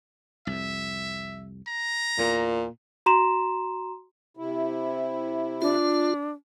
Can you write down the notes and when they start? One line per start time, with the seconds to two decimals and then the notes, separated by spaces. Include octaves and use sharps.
0.47 C2 F2 E5
1.67 A#5
2.18 E2 A#2
3.06 F#4 A#5 C6 E7
4.37 C3 E4
5.62 D4 F4